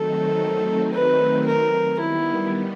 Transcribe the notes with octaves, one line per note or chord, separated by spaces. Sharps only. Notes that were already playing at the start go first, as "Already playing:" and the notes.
Already playing: D#3 F#3 A3 C4 D#4 A4
B4
A#4
D#3 G3 B3 E4